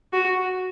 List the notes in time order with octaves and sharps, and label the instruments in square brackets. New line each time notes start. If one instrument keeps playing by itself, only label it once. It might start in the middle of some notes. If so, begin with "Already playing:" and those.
[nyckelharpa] F#4